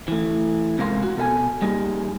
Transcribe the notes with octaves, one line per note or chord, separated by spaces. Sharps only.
E3 A3
F2 C3 G#3 A#4 F5 C6
F#4
B2 A4 E5 G#5
G3 A#3 D#4 G4 G#4